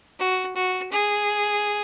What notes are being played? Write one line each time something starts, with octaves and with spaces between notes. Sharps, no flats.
F#4
F#4
G#4